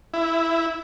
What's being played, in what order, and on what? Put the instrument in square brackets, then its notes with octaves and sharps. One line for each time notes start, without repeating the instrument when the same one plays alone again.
[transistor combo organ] E4